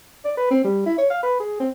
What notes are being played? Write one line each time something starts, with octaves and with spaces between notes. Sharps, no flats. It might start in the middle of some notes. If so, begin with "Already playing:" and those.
D5
B4
C4
G3
E4
C#5
F5
B4
G#4
C4